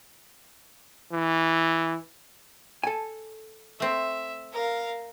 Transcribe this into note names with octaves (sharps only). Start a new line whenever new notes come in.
E3
A4 G#5
A3 C4 E5
A#4 F5